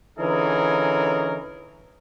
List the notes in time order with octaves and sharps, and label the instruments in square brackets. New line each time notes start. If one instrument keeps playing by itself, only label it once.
[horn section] D3 E3 C#4 D#4 G#4 A#4